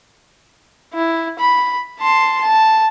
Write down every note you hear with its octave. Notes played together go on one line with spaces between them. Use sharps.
E4
B5
A5 C6
A5